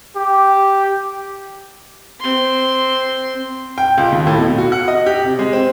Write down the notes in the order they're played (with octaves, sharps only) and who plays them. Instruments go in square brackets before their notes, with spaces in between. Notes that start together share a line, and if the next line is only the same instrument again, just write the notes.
[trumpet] G4
[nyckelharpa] C4 C6
[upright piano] G5
C#2
D#2
A2
B2
F#4
F#5
D#5
G4
C3
G#3
C4